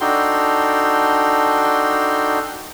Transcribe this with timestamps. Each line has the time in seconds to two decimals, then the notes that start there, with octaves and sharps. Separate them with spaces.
0.01 D4 D#4 F#4 A4 G5 C6